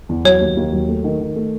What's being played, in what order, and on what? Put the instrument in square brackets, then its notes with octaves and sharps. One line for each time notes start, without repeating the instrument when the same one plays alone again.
[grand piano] E2
[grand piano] F#3 [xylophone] C#5
[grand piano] D#2
D#2
F#3
A3
D#3
D#3
A3